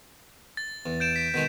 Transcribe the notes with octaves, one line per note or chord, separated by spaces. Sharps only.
A6
E2
G6 D7 E7
B6 D7
B2 D#3 G#3 B6